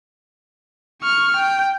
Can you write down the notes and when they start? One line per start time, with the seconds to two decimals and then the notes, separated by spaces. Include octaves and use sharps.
1.02 C#6 F6
1.36 G5